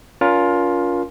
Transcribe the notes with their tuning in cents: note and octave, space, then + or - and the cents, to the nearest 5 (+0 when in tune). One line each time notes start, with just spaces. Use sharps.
C#4 +40 F4 +10 A#4 +20